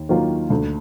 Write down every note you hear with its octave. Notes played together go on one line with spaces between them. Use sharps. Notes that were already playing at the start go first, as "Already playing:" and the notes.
Already playing: D#2
D#3 F#3 A#3 F4
D2